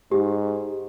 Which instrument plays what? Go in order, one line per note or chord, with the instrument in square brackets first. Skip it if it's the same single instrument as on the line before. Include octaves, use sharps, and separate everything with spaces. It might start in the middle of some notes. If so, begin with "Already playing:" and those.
[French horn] G#2 [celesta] G4